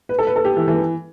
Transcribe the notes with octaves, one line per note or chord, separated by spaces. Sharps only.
B4
A4
B4
A4
G4
E3
E3